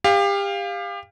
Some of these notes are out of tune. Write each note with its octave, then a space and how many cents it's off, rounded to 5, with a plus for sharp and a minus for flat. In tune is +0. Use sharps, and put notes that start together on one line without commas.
G4 +30 F5 +0